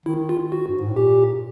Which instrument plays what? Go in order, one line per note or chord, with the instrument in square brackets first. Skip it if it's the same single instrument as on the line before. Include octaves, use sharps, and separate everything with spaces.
[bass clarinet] D#3 [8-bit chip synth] E4
[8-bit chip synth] F4
F#4
[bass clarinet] G2
G#2
A2
[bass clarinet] A#2 [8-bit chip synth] G4